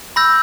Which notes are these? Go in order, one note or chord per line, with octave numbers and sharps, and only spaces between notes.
B5 E6 G6 A#6